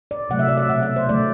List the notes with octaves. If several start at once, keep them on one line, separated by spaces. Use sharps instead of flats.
D5
C3 F#3 A3 F#5
E5
D5
E5
B2 A3 F#5
E5
C5
D3 F#3 A3 D5